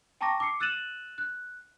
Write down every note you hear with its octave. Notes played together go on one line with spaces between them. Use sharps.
G5 A5 A#5 C#6 D6 A#6
D6 E6 C7 C#7
E6 F#6 A6 D#7 E7 F#7
F#6